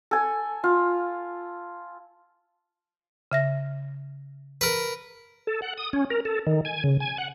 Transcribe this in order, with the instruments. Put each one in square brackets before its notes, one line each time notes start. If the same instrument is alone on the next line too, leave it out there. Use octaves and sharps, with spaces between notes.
[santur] A4 G#5
F4
[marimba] C#3 E5 A#6
[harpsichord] A#4 B4
[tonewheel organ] A4
F#5
D#6
C#4
A#4
A4
D#3
G#5
C#3
G#5
F#5